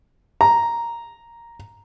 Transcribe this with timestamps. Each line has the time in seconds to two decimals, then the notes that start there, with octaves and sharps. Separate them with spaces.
0.41 A#5